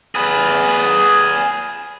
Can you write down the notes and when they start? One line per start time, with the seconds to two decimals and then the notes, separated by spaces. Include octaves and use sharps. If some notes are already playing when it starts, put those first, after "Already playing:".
0.15 G#4 B4